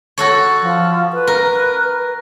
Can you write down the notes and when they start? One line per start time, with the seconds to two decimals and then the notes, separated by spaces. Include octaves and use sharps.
0.18 F#4 A4 C#5
0.62 F3
1.13 B4
1.27 A#4